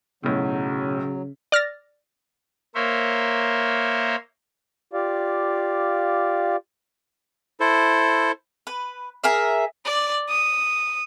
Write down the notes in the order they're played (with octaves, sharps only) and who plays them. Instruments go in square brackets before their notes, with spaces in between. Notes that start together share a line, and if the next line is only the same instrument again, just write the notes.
[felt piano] B1 A2 [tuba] C#3 [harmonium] F#3
[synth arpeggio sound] D5 F6 A6 A#6
[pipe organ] A#3 A#4 C5 C#5 E5
[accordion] F4 G4 D5 F5
[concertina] E4 A4 C5
[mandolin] B4
G#4 A#4 E5
[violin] D5
D#6